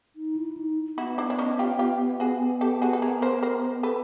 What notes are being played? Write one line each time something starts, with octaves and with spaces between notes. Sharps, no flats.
D#4
E4
D#4
B3 E4 F#4
D4 E4
D4
C#4 D#4
F4 G4
F4 G4
F#4 G#4
G4 A4
F#4 G#4
A4
G#4 A#4
A#4 C5
A#4 C5
A4 B4